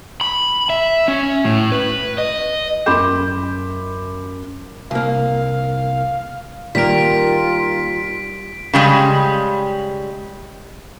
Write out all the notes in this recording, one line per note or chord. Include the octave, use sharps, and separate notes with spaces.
B5
E5
C#4
A2
B4
D#5
F#2 B5 C6 D6 G6 E7
C2 A#3 F5
D#3 G3 A#3 F4 A#4 B6 D7
C#3 G3 G#3